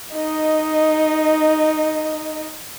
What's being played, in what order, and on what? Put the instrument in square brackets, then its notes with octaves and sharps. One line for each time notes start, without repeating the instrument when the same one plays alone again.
[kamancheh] D#4 D#5